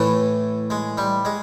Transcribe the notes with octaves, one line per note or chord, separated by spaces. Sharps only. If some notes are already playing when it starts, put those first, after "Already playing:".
Already playing: A2 E3 A3
G#3
G3
G#3